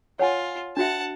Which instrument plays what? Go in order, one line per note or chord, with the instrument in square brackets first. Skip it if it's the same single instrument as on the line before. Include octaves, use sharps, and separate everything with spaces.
[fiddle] F4 [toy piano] C#5 F#5 G#5
[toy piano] D4 F#4 E5 [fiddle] F#5 A5